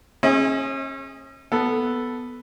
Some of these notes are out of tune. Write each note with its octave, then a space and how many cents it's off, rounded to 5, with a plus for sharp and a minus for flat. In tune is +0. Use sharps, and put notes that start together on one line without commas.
C#4 -35 G#4 +0 D#5 +40
B3 +0 A4 +0